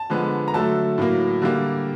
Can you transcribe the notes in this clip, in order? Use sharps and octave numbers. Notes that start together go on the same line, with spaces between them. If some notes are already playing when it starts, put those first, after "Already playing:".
Already playing: A5
D3 F3 G#3 B3
A#5
D3 F#3 A3 A5
A2 F#3 A#3
D3 G3 A#3